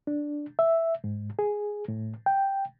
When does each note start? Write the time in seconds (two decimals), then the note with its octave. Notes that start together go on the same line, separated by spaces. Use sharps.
0.07 D4
0.59 E5
1.04 G#2
1.39 G#4
1.88 A2
2.26 G5